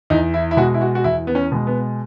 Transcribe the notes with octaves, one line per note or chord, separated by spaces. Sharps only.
E2 D#4
E4
E4
B2 G#3 F#4
E4
F#4
F#4
E2 E4
B3
C#4
B2 G#3
B3